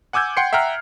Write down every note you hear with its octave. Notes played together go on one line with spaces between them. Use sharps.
F#5 G#5 D6 E6 G6 G#6
F#5 G5 C6 C7 C#7
E5 F#5 G5 A#5 F6 F#6